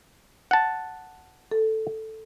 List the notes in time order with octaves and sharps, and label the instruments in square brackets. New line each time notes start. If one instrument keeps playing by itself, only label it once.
[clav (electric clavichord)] F#5 A5
[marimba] A4